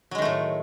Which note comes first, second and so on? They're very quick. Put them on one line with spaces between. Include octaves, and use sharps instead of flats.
F#3 G#3 D#3 A3 A2